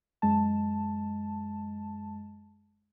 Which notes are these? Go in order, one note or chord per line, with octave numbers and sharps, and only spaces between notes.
F#2 G#3 A5